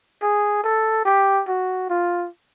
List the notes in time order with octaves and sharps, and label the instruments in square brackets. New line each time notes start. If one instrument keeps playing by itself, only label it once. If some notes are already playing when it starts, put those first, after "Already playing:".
[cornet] G#4
A4
G4
F#4
F4